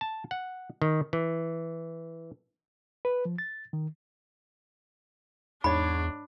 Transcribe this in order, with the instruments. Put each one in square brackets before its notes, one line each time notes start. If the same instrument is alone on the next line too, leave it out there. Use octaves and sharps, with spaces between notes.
[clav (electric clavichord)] A5
F#5
D#3
E3
[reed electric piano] B4
F3
A6
D#3
[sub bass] E2 [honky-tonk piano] G#2 C#5 [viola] D4 [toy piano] B5